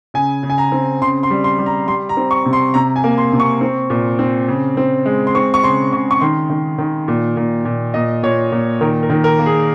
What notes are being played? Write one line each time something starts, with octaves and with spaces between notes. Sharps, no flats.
C#3 G#5
C#3
G#5
A#5
C4
C#3 C6
C6
G3
C6
G3
A#5
G3 C6
A#5
C4
C#6
C3
C6
C3 A#5
G#5
A#3
C6
C3
C#6
C4
A#2
C4
C#3
C4
G#3
C6
C4 C#6
C#6
C#3 C6
C#3 C#6
C#6
D#3 C6
D#3
D#3
A#2
A#2
A#2
A#2 D#5
A#2 C#5
A#2
D#3 A#4
A#4
D#3
A#4
A#3
G#4